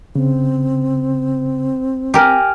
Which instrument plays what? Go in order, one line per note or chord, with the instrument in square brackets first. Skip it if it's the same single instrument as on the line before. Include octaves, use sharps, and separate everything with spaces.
[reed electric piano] C#3 [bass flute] C4
[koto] G4 A#4 [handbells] G5 G#5 F6